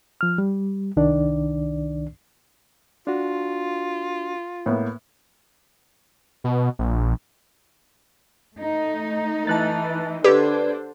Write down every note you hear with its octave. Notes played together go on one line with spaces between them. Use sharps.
F3 F6
G3
C2 D#3 D4 D5
D4 F4 F#4
A2 A#3 B3
B2
A#1
A3 D#4
E3 A5 F#6 A6
D3 D4 G4 A4 B4 C5 D5 G#6